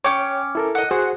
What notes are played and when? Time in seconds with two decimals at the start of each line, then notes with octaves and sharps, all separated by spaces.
0.04 C#4 C#5 G5 D6
0.55 E4 A4 A#4
0.75 D#5 F#5
0.91 F#4 G#4 C5 F#5